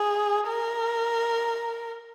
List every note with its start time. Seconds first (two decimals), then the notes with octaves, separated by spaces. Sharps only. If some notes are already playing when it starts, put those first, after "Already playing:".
Already playing: G#4
0.48 A#4